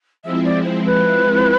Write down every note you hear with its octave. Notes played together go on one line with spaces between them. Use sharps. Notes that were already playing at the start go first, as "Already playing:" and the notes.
F3 G#3 C4 E4 E5
D5
C5
B4